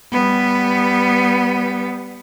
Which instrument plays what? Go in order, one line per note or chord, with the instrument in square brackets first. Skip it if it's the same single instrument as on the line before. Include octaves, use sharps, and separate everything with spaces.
[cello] G3 B3